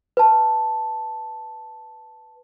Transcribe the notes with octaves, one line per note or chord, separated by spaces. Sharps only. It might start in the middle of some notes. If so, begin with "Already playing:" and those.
B4 A5